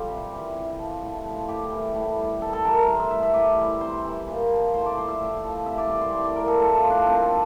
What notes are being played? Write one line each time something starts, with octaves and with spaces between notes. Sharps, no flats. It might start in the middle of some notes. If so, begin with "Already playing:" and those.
Already playing: G3 F4 G4 A4
C3
E3 G3
C3
F3
A2
F3
A2 G4
E3 G3
A2
G3
C3 A4
A4
E3 G3 A#4
A#4
A2 C5
E5
G3 E5
E5
A2 D5
E3 G3
C3 C5
E3 G3
A#2
F3
A2 C5
D5
G3 C5
E5
A2
F3
C3 E5
D5
E3 G3 D5
C5
A2 D5
D5
F3 A#4
A4
A2 A4
F4
F3
D4
A#2 C4
A4
G3